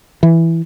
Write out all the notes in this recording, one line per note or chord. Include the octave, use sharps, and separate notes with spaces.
E3